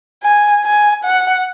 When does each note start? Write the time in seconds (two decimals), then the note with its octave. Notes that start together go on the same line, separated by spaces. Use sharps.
0.23 G#5
0.65 G#5
1.04 F#5